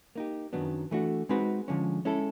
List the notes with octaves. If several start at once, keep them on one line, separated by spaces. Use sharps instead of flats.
A#3 D#4 G4
F#2 D#3 F#3 B3 D4
E3 A3 D4 F#4
G#3 C4 D#4 F#4 B4
D3 F3 G#3 C#4
G#3 C#4 E4 A4